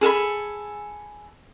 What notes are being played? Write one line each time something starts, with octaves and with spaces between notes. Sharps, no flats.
G#4 A4 G#5 B5